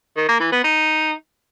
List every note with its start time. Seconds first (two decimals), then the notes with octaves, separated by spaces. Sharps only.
0.17 D#3
0.28 A#3
0.40 E3
0.52 B3
0.64 D#4